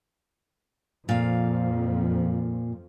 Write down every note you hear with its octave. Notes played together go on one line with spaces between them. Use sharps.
F2 A#2 F3 F5